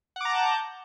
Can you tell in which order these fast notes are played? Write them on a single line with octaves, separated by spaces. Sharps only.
F#5 D6 A#5 A5 G6